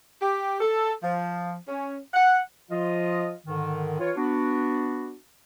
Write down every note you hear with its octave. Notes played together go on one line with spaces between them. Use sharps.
G4
A4
F3
C#4
F#5
F3 F4 D#5
G#2 D3 D#3
E3 F4 C#5
B3 D4 F#4